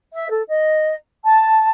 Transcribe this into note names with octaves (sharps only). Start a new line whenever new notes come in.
E5
A4
D#5
A5